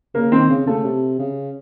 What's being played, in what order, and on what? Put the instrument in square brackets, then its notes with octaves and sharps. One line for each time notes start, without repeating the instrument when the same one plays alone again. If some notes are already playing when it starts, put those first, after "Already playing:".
[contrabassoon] C#3 [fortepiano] A#3
[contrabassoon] D#3 [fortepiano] C4
[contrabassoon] C#3
[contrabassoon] C#3 [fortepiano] A3
[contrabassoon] C3
C#3